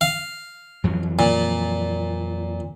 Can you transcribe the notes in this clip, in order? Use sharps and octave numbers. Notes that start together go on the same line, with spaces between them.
F5
F2 E3 F#3
A#2